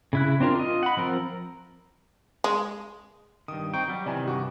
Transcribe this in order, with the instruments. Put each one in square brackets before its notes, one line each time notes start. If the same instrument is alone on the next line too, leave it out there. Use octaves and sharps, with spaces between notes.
[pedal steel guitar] C#3 E4 F#6
C4 D4 F4 A#4
F4 D#5
F#5 B5
F3 C4 A#4
[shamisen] G#3
[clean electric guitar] G2 D#3 [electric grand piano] D#6
[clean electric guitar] C4 D#4 G5 [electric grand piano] C#6
[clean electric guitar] F#3 G3
[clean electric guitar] C3 D#3 E3 [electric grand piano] D5 G#5
[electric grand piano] G2 F#4 D6